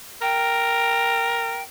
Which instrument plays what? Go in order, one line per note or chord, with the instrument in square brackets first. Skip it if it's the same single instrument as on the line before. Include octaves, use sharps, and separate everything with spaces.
[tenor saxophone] A#4 [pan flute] G5